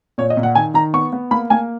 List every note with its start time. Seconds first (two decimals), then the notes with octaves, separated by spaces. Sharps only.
0.18 A#2 C#5
0.30 D#5
0.37 A#2
0.43 F#5
0.55 D#3 G#5
0.74 D#3 A#5
0.94 B3 C#6
1.13 B3
1.31 A#3 B5
1.50 A#3 G#5